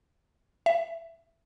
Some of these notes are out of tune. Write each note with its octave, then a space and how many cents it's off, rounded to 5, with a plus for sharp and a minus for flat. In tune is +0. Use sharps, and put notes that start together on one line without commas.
E5 +10